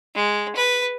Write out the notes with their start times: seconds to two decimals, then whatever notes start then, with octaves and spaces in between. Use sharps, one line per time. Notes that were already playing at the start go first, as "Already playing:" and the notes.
0.15 G#3
0.56 B4